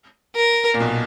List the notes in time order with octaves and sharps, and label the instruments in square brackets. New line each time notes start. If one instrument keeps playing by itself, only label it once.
[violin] A#4
[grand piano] A#2
B1 B2